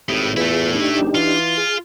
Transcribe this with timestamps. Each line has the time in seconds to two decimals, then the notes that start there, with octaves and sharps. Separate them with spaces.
0.09 G#1 A2 G4 B5 D#6
0.37 E2 A3 E4 F4 G#4 B4
0.75 D4 D#4 G4
1.00 F#1
1.15 E3 F4
1.57 G#4